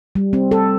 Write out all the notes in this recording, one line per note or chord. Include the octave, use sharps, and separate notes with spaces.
G3
C4
A4